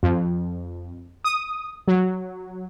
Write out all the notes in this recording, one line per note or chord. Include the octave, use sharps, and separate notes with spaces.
F2
D#6
F#3